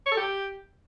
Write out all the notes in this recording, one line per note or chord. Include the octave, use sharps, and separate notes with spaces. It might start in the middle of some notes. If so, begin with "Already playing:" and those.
C#5
A4
G4